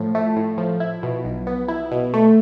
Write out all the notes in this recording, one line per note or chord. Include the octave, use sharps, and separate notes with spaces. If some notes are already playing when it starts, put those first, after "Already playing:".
Already playing: A2 F3
A3
A2
F3
E4
B2
B1
B3
E4
B2
A3